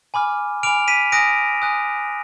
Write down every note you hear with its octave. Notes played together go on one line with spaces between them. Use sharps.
G#5 B5 D6 F6
G#5 B5 D6 F6 D7 F7
B6 D#7
G#5 D#6 F#6 A#6 D7
G#5 D#6 F#6